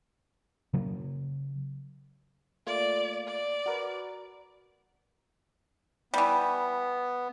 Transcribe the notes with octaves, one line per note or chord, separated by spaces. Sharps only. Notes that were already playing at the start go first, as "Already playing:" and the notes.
C#3 F#3
A3 A#3 F4 D5
D5
F#4 A#4 B4
E3 G3 B3